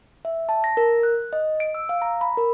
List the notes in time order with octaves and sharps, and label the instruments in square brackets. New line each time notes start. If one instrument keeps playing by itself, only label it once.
[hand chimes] E5
A5
A#6
A#4
F#6
D#5
D7
E6
F5
A#5
B5
A#4